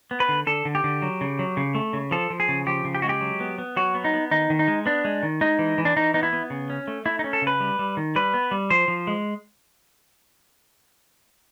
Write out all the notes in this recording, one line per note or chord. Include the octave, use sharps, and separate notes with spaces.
B3
B4
D3
D3 A4
D3
G4
D3
F#3
C#3
F#3
C#3
A3
C#3
F3 A4
F3
G#4
C#3
F3 G4
C#3
G4
G#3 F#4
G4
F#3
B3
B3
F#3 F#4
B3
D#4
B3
D#3 D#4
D#3
D#4
G#3
B3 D4
G#3
D#3
G#3 D#4
E3
E3
D4
E3 D#4
B3 D#4
E4
B3
C#3
C#4
A3
A3 E4
D#4
C#4
A4
C#3
B4
G3
G3
D#3
G3 B4
B3
G3
F3 C5
F3
G#3